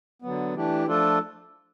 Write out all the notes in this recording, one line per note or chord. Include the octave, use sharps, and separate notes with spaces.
D3 F#3 B3
E3 A3 D4 G4
F3 A3 D4 F4 A4